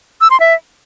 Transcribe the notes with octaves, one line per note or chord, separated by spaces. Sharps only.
E6
C6
E5